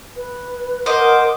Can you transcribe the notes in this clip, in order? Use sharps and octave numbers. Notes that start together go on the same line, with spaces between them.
B4
A#4 C5 D#5 F#5 D6